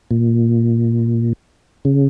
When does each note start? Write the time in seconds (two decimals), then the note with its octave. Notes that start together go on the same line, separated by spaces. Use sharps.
0.11 A#2
1.85 C#3